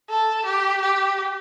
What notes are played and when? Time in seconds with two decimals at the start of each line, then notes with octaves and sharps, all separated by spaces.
0.10 A4
0.46 G4
0.83 G4